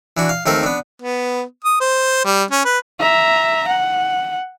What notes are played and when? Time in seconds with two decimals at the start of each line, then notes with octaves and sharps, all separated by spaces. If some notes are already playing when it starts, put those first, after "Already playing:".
0.17 E3 D4 F#4
0.29 F5
0.46 D#2 A3 C4 A#4
0.63 B3 D4
1.02 B3
1.64 D#6
1.80 C5
2.25 G3
2.51 C#4
2.65 B4
3.00 E5 A#5
3.68 F#5